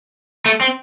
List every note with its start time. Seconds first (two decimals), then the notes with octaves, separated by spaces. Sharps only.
0.46 A3
0.61 C4